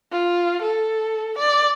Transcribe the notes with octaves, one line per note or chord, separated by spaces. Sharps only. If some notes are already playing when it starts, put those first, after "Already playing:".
F4
A4
D5